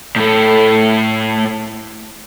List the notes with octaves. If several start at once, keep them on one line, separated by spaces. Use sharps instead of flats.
A2 A3